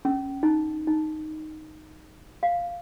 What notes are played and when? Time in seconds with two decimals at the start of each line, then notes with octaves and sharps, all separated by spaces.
0.05 C#4
0.43 D#4
0.87 D#4
2.43 F5